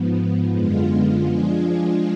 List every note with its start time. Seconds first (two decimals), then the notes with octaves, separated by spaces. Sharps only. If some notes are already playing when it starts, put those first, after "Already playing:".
Already playing: G#2 F3 B3
0.54 F#2 D3 G#3 B3 F4
1.27 F3 G#3 D4 F4 G#4